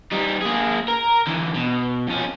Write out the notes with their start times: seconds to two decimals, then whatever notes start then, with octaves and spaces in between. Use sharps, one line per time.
0.12 G3 D#4
0.42 A#3 G#4
0.88 A#4
1.27 D3 E3
1.55 B2
2.08 F2 C#4